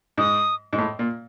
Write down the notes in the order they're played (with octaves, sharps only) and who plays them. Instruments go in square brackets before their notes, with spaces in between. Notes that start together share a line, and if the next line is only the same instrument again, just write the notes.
[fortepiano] G#2 [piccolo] D#6
[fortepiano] G#2
A2
A#2